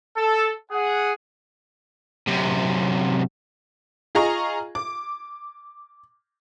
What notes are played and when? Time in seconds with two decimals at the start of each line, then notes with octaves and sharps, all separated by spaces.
0.17 A4
0.71 G#4 F#5
2.27 F#2 C3
4.15 F4 G#4 D#5 A#5 C#6
4.75 D6